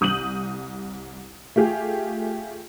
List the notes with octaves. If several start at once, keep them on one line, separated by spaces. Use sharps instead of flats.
C2 D#6 G6 D#7 F#7
A3 F4 G4 G#4